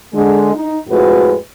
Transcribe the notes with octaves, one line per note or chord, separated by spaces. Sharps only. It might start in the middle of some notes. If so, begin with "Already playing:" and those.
D3 G#3
D#4
F2 A2 G#3 F#4 B4